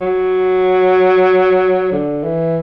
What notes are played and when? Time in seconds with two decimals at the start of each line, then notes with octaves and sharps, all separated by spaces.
0.01 F#3
1.92 D3
2.24 E3